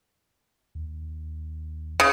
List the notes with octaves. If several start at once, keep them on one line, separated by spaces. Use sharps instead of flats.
D#2
C#3